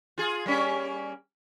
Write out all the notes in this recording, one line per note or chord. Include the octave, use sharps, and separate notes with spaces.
F4 G#4
G3 A#3 C#4